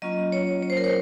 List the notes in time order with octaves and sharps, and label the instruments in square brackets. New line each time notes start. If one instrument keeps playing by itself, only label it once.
[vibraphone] F#3 A#3 C#4 F4 D#5
C#5
C#5
C5
A#4
C5